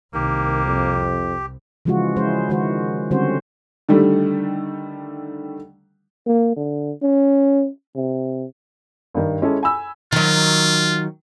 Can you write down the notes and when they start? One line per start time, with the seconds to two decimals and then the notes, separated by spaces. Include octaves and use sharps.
0.14 C2 D#3 A#3 G4
0.66 F2
1.85 C#3 E3 F3 G#3 F4 F#4
2.16 G#3 C#4 E4 C5
2.50 D#3 G#3 F#4 C5
3.11 D3 G3 C4 C#4 F#4 C5
3.89 D3 D#3 G3 A3
6.27 A#3
6.57 D3
7.03 C#4
7.96 C3
9.14 G2 D#3
9.42 G#3 C#4 E4 G#4 A4
9.63 G#5 B5 E6
10.12 D#3 F#3 F4